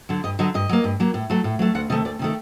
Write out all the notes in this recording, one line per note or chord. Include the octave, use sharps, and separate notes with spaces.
D3 F#3
G2 D#5
D3 F#3 D#5
G2 D#5
F#3 A#3
G2
F#3 A#3
A2
F#3 A3
A2
F#3 A3
D2 F#5
C3 D#3 A3 D#5
D2 D5
C3 D#3 A3